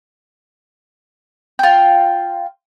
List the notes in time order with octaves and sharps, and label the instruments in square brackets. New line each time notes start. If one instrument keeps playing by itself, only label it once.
[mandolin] F4 G5